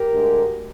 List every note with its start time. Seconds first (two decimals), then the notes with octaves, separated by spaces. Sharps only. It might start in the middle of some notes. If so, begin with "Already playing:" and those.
Already playing: G4 A#4
0.12 D2 D3 G#3